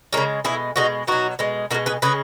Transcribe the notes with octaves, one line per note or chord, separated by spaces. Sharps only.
C#3 G#3 A#3 C#4
B2 G#3 E4 G#4
B2 G#3 D#4 F#4
B2 F#3 D#4 F#4
B2 G#3
B2 G#3 F#4 A#4
G#4 B4
C#3 G#3 G#4 B4